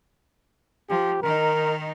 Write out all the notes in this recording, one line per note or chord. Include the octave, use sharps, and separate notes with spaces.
F3 G4
D#3 D#4 A#4